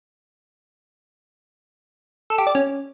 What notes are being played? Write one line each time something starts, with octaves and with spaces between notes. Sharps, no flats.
A4
G4
D5
C#4